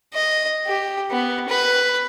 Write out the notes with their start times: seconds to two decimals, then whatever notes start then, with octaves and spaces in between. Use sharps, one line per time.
0.14 D#5
0.67 G4
1.11 B3
1.49 B4